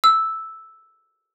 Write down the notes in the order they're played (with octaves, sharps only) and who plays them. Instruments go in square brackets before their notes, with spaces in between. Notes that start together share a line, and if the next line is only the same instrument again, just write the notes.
[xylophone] E6